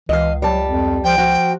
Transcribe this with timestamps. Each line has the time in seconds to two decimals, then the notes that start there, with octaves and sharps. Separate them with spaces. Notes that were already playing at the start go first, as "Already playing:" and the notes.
0.09 C#2 E3 D#5 F5
0.42 F#3 G3 A5
0.67 F2
1.04 F3 G5
1.18 F3 F#4